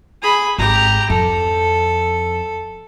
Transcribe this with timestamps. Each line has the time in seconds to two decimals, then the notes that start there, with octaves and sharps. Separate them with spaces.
0.23 G#4 B5
0.58 G#1 G4 A#5
1.10 F2 A4